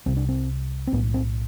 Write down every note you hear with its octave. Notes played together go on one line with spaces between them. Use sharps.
C2 C3 C4
D4
C4
C4
B1 A2 B3
C4